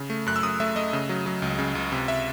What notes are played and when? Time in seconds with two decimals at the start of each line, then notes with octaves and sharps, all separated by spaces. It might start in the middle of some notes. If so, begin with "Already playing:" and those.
Already playing: C#3
0.10 A3
0.26 F#2 F#6
0.36 E6
0.43 F#2 D#6
0.60 A3 E5
0.76 A3 D#5
0.93 C#3
1.09 F#3
1.26 F#3
1.42 C#2
1.59 C#3
1.75 C#2
1.92 C3
2.08 E5